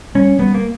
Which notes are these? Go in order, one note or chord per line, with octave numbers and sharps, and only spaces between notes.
G3 C#4
G3 B3
A#3